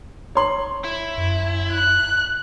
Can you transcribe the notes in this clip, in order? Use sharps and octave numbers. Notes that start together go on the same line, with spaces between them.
C#5 C6 F#7
E4
F#2
F#6